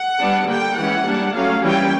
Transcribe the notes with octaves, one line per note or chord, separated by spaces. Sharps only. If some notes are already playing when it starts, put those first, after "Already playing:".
Already playing: F#5
G3 B3 D4
D3 G3 A#3 G5
E3 G#3 C#4 F#5
G3 A#3 D4
F#3 A3 C#4 F5
E3 G3 A#3 C#4 G5